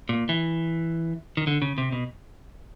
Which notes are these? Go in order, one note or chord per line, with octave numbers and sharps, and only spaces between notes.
A#2
E3
D#3
D3
C#3
C3
B2